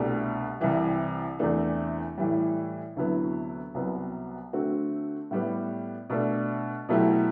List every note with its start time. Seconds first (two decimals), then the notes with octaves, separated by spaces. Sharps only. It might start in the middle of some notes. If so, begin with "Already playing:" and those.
Already playing: C2 B2 A3 D4 G4
0.61 C2 C3 E3 G3
1.39 E2 C3 E3 A3 D4
2.18 A2 E3 G3
2.96 D2 C3 F#3 B3 E4
3.74 C2 C3 F#3 B3
4.53 D3 A3 C4 F#4
5.31 A2 G3 B3
6.10 B2 A3 D4
6.89 B2 F#3 A3 E4 G4